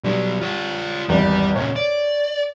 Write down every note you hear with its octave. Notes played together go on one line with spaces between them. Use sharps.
B2 F#3 G3 D4
F4 C#5
G#1 E2 G2 G3
A#2 C#3 C#5
D5